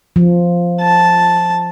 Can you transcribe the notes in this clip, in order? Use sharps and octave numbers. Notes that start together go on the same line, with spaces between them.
F3
A5